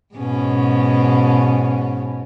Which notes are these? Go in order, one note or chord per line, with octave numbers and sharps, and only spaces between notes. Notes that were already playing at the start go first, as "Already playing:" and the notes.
G#2 B2 C#4